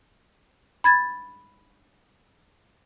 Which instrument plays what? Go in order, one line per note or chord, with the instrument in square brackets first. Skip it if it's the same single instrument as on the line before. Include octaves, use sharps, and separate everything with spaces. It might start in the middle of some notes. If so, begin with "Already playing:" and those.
[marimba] B5 G#6 A6